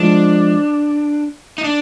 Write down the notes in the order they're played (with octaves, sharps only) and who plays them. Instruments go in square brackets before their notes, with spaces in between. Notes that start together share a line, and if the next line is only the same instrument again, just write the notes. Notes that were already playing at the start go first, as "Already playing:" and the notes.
Already playing: [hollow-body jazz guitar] F3 G#3 [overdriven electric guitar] D4
[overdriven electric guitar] D#4
D4